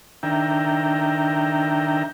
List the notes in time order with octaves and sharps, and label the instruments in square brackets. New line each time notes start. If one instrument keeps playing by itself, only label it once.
[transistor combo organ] D#3 D4 E5 G5 A#5